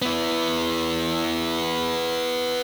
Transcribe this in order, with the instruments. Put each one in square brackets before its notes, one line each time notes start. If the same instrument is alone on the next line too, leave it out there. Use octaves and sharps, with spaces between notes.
[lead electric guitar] B3 E4